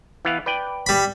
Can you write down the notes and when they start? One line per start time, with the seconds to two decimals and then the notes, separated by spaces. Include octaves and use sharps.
0.25 E3 B3 F5
0.46 B4 D5 G5
0.86 G3 B5